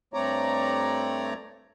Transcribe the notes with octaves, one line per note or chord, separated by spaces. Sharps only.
G2 A3 C4 C#5 D5 A#5